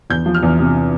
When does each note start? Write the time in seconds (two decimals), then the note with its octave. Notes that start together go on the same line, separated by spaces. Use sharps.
0.10 E2 G6
0.26 F3
0.34 F6
0.43 E2
0.59 C3